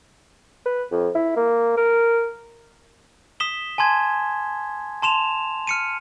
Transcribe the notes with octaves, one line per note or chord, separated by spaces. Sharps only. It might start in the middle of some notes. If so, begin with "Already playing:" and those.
B4
F2
E4
A#3
A#4
D#6 B6 E7 G7
G#5 A5 C6 G#6
A5 C6 E7 F7
F6 C#7 D#7